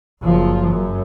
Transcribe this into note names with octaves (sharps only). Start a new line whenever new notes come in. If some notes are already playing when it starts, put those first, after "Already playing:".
F#1 F3
F#2